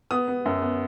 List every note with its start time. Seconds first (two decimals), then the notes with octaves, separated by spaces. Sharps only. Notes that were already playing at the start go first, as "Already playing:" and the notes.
0.11 B3 D#6
0.28 B3
0.46 F#2
0.62 B3